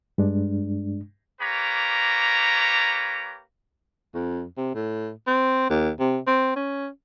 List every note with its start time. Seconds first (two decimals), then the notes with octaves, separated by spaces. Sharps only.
0.18 G2 G#3 D4
1.41 A#3 G4 B4 C#5 A#5
4.15 F2
4.57 C3
4.75 A2
5.27 C4
5.70 D#2
5.99 C3
6.27 C4
6.56 C#4